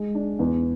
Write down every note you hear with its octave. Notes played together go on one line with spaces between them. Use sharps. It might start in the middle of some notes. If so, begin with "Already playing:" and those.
Already playing: G#3
D4
E2